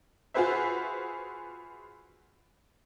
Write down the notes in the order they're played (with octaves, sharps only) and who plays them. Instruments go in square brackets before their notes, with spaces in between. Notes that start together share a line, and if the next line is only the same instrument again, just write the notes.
[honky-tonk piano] F4 F#4 G#4 B4 C5 E5